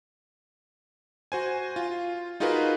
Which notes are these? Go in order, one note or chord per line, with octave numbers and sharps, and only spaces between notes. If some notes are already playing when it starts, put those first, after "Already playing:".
F#4 C5 G#5
F4
D#4 F4 F#4 G#4 A#4 B4